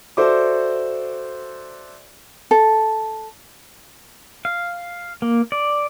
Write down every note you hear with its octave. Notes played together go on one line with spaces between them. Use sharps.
F#4 A4 C5 D5 E5 D6
A4
F5
A#3
D5